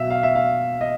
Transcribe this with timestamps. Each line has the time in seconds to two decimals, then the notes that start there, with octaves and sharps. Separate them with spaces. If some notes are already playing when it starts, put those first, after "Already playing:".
Already playing: B2 F#3 E5 F5
0.10 F5
0.23 E5
0.35 F5
0.81 D#5